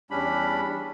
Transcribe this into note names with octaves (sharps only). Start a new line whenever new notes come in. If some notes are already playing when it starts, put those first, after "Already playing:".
E2 G3 C#4 D4 B5